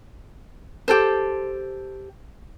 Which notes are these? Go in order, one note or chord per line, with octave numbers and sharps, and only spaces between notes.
G4 A4 C5